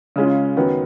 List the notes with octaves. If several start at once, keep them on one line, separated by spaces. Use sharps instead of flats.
C#3 G#3 C#4 F4
F#2 D#3 F#3 B3